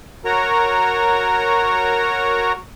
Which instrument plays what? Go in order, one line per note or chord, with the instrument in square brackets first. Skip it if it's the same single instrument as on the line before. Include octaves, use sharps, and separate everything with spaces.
[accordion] F#4 A#4 C#5 A#5